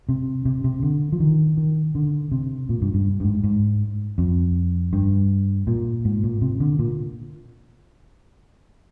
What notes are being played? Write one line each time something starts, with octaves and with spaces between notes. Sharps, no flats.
C3
C3
C3
D3
F3
D#3
D#3
D3
C3
A#2
G2
G2
G2
G#2
G#2
F2
G2
A#2
G#2
A#2
C3
D3
A#2